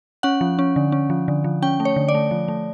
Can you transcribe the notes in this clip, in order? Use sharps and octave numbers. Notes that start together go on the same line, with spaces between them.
C#4 F#5
F3
C#4
D3
C#4
F3
D3
F3
C#4 G5
A3
C#5
D3
D5
A3
F3
A3